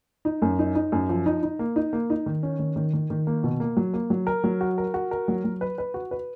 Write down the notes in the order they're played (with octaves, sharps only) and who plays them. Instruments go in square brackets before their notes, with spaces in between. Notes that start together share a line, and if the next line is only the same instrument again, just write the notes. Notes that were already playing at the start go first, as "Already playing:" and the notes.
[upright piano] D#4
F#2
D#4
D#4
F#2
F3
D#4
D#4
A#3
D#4
A#3
D#4
D#3
C#4
D#3
D#3
D#3
D#3
A#3
B2
A#3
F#3
A#3
F#3
A#4
F#3
F#4
A#4
F#4
A#4
F#3
F#3
B4
B4
F#4
B4